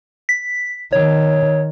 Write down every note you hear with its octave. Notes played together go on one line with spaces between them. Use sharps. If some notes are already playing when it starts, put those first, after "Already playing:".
B6
D#3 C#5